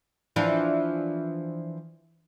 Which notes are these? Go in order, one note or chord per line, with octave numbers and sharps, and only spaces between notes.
E3 F3 D4